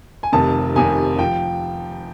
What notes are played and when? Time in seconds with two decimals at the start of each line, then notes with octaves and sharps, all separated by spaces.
0.23 G#5
0.32 F1 F2 C3 D#3 A5
0.75 F1 F2 C3 D#3 G#5
1.19 F3 G5